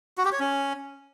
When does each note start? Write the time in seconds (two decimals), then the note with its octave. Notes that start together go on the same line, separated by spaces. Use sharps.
0.18 F#4
0.25 G4
0.32 C#5
0.40 C#4